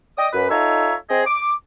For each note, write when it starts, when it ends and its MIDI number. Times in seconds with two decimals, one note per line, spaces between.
0.18 0.29 74
0.18 0.29 75
0.18 0.29 79
0.18 0.29 87
0.33 0.48 42
0.33 0.48 71
0.50 0.95 63
0.50 0.95 65
0.50 0.95 69
0.50 0.95 73
0.50 0.95 76
0.50 0.95 82
1.10 1.22 60
1.10 1.22 68
1.10 1.22 75
1.26 1.52 86